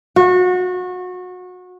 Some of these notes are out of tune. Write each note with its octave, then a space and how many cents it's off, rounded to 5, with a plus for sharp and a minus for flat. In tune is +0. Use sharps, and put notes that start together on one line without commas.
F#4 -25